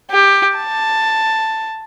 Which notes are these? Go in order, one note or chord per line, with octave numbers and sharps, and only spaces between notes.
G4
A5